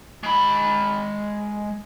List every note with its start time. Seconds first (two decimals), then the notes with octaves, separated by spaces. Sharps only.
0.23 G#3 B5